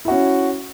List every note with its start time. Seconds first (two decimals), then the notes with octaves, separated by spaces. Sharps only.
0.05 E4
0.08 F#4
0.11 C#4